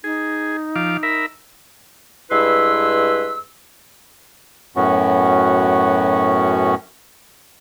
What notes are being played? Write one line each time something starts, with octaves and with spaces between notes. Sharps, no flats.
D#4 G#4
F3 F5 D6
A#4 E5 B5
G2 G#3 E4 B4 C6 E6
F#2 A2 B3 C#4 F#4